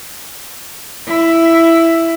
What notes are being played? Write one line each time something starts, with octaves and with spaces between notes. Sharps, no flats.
E4